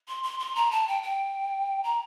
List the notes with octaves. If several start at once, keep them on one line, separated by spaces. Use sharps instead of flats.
C6
C6
C6
A#5
A5
G5
G5
A#5